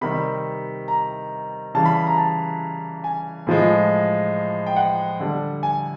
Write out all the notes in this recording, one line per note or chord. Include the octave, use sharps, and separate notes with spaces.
C3 D#3 G3 B5
A#5
C#3 E3 G3 A5
B5
A#5
A5
G#5
A2 F3 G#3
G5
F#5
D3 G3
G#5